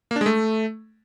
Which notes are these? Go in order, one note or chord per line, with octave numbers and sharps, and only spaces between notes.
A#3
D4
G#3
A3